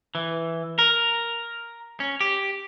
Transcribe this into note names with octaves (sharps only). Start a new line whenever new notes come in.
E3
A#4
C#4
G4